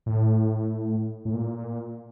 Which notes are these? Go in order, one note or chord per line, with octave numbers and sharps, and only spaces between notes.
A2
A2
A#2